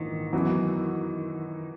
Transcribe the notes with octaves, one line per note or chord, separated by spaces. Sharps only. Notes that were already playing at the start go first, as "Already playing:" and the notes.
Already playing: A#1 G#2 D#3 E3
F#2 E3 B3 F#4